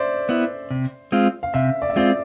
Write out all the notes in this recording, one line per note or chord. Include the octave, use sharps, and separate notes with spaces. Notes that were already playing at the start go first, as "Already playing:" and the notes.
Already playing: C5 D5 E5
B3 E4
C3
G#3 C4 F4
F5
C3 E5
D5
E5
G#3 C4 F4 D5